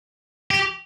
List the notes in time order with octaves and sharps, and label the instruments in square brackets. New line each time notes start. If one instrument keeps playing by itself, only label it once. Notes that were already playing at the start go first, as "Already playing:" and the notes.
[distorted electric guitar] G4